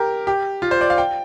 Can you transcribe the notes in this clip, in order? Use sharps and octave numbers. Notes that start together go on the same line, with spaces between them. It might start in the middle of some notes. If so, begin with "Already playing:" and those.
Already playing: G4 A#4
G4
F4
C5
D5
F5
G5